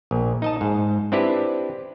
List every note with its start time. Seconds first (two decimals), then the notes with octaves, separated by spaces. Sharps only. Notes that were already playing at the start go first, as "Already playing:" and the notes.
0.11 A#1
0.42 D#4 D#5 A5
0.61 G#2
1.12 C4 D4 E4 G4 B4